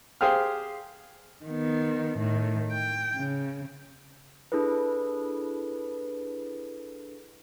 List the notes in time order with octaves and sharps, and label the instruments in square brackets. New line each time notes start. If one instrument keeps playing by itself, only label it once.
[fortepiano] G4 G#4 C5 F5 G5 F6
[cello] D#3 B3
A2 D#3
G5
C#3
[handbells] D4 E4 G#4 A4 B4